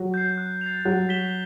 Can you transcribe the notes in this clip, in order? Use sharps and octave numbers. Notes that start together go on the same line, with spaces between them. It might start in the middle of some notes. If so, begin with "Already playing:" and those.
Already playing: F#3 F#4
G6 C7
F#6
A6 C7 F7
F#3 F#4 F#6
B6 E7 G7